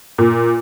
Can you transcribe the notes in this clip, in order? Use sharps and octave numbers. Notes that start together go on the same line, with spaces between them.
A#2